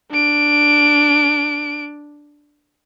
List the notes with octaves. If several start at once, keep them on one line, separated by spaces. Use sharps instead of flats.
D4 D7